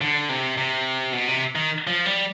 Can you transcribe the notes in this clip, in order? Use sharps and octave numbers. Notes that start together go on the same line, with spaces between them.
D3
C3
C3
B2
C3
D#3
F3
G3